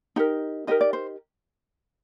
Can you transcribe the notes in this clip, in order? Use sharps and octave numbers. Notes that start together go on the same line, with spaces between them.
D#4 G4 A#4
D#4 G4 A#4 D#5
D5
C5